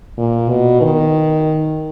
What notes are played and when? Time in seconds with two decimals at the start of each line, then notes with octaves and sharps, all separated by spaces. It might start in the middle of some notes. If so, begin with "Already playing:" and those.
0.17 A#2
0.49 B2
0.81 D#3